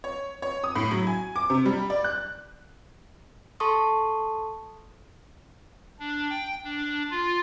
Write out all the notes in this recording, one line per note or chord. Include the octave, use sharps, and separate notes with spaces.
C#5
C#5
D#6
A2
F#3
G#5
D6
C3
G3
D5
F#6
A4 A5 C6 C#6 D#6
D4
G5
D4
F4